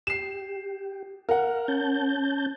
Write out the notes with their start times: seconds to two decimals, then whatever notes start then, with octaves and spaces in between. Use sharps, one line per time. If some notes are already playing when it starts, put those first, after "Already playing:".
0.07 G4 C7 E7
1.29 A#4 F5 F#5
1.68 C#4 A5 G6